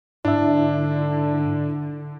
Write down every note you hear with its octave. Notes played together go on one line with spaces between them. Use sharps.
G#2 D3 D4 E4 D5 E5